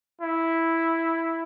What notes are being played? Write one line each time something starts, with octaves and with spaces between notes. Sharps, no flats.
E4